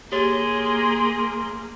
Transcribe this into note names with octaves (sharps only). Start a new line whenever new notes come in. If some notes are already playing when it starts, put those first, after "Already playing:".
A#3 G4 G#4 C#5 C6